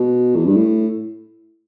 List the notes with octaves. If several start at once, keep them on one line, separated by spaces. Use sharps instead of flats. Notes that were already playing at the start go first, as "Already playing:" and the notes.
Already playing: B2
E2
G2
A2